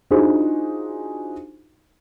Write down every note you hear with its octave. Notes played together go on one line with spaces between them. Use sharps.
D4 D#4 F4 F#4 G#4 C5